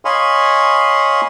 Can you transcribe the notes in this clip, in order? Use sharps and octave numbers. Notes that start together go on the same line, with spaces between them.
C#5 D#5 F5 G#5 B5 C6